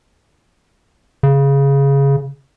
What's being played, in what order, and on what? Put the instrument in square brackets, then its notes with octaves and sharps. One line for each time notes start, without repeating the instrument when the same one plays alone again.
[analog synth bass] C#3